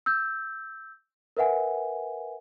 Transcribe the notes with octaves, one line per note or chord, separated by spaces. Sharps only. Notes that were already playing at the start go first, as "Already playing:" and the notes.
E6 G6
A#4 B4 E5 F#5 G#5